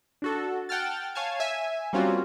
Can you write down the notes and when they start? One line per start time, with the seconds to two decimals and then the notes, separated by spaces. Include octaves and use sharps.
0.22 D4 F#4 A4
0.69 F#5 G5 A5 F6 A6
1.15 C#5 F5 G#5 A5 G#6
1.40 E5 G#5
1.93 G3 A#3 C4 C#4 F4 F#4